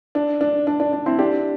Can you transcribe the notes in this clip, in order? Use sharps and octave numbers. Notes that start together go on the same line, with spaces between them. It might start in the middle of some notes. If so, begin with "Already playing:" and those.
D4
D4
D4
D4
D4
C4 E4
D4 G4